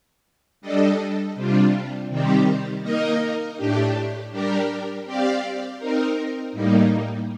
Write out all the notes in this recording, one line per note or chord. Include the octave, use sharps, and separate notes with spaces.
G3 D4 A4 D#5
C3 G3 D4 F4
C3 D#3 G3 C4 G4
A#3 D#4 A#4 D#5
A2 A3 D4 G4
G3 D4 G4 A#4
C4 G4 D5 F5
C4 D#4 A#4
A2 G3 A#3 D#4